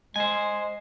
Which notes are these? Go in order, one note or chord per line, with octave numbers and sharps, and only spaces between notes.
G#3 C5 G#5